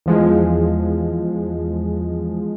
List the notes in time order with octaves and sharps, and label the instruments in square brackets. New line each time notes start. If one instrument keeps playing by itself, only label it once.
[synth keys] E2 F3 G#3